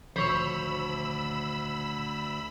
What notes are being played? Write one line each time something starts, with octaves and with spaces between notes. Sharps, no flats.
D2 A#2 D#3 F3 C5 C#5 B5 E6